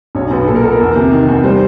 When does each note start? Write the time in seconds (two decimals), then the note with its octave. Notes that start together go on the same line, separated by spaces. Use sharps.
0.15 B1 C#5
0.31 B1 B4
0.48 A#2 A4
0.56 A#4
0.63 B3 A4
0.72 A#4
0.80 E2
0.96 C3
1.12 D#3
1.28 E2
1.43 G3 C5